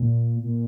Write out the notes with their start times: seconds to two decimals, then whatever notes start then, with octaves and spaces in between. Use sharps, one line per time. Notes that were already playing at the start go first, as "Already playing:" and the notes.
Already playing: A#2
0.43 A#2